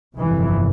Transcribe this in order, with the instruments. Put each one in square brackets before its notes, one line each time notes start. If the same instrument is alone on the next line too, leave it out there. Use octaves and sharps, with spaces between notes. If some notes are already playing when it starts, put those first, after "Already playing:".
[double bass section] G1 F2 C3 E3